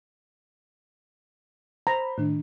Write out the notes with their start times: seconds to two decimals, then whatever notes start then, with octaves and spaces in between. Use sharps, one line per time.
1.87 C5 A#5 B5
2.18 A2 D#3 D4